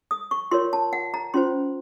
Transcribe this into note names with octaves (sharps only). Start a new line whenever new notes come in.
D#6
C#6
F4 A#4 C#5 C6
A5
F#5
A#5
C#4 F4 C5 C6